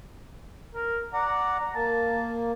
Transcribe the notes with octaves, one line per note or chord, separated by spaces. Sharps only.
A#4
D5 F#5 A#5
A#3 A5